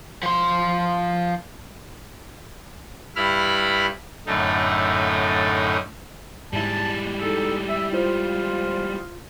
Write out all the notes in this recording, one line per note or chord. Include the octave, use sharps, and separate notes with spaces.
F3 C6
G2 E4 B5 F6
F#2 A2 D3 A3 D#4
G#2 G3 G#3 E4 A5
D#4 G#4 A4
E5
E4 F4 C5 D#6